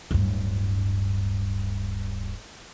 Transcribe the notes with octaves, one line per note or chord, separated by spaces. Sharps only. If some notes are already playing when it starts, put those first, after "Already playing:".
D1 G2